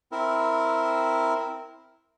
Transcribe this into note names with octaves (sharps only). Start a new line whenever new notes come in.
C4 E4 A#4